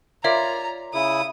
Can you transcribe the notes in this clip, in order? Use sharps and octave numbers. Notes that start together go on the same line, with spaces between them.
F4 A#4 C#5 D5 E5 A#5
C#3 E4 D#6